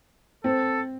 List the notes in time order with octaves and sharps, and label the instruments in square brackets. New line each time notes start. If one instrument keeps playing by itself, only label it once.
[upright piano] C4 [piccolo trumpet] A4